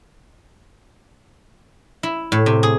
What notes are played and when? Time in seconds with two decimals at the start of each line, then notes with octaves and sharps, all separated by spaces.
2.03 E4
2.32 A2
2.46 C3
2.63 G#4